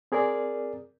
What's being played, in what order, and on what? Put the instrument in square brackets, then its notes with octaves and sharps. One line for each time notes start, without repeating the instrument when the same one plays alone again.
[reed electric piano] C4 G#4 A#4 D5